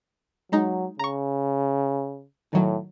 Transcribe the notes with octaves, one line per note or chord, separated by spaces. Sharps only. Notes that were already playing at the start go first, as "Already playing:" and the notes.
F#3 G#3 D#4
C#3 A#5 C#6
A2 D#3 F#3